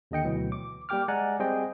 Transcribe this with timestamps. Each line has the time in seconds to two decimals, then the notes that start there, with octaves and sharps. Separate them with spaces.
0.11 D#2 D3 D#5 G5 C#7
0.24 D2 B2 E3 F#3
0.52 D6
0.89 G3 A#3 G4 G5 D6 F6
1.08 G#3 D5 F#5 G#5 A#5 F#6
1.39 G3 C4 G#4 C5 D#5 G5